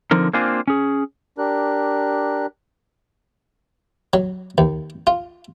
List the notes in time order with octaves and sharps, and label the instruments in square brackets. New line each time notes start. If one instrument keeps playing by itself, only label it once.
[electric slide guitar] D3 F3 C4 D#4 A#4
A#3 C4 D4 F4 C5 G#5
C#4 G#4
[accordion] D4 G4 A#4 F#6
[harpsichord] F#3
D#2
F4